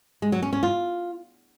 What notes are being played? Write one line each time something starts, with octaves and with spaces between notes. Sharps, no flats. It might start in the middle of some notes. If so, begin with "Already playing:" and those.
G#3
F#3
C#4
C#4
F4